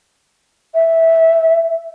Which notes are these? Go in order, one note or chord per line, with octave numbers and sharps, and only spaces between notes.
E5